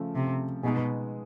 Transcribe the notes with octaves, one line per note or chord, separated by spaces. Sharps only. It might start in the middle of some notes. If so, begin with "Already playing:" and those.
Already playing: C#3 F3 A3
C3
B2 G#3 B3 D#4 G#4